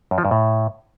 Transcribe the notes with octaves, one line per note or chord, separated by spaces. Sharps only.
F#2
F3
G2
A2